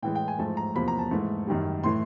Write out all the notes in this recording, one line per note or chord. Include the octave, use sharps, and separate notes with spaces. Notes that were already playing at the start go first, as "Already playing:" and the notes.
A2 E3 G#3 G5
G5
G#5
G#2 F3 A3 A5
A#5
E2 C3 F3 A#3 B5
A#5
A5
G#2 E3 A3
F#2 D#3 G3
A2 E3 A3 C6